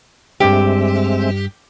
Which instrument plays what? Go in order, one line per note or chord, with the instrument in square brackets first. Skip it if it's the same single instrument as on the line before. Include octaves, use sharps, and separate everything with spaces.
[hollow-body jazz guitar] G2 D4 [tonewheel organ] G#3 C4 E5 [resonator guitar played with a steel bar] G4